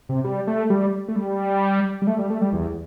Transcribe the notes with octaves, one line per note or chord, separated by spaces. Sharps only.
C3
G3
A3
G3
A3
G3
G3
A3
G3
A3
G3
E2